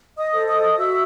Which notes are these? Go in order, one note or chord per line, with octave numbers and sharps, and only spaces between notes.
D#5 D#6
A4 C5
D#5 D#6
F#4 E5 E6